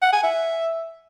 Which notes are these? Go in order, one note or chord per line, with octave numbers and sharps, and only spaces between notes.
F#5
G#5
E5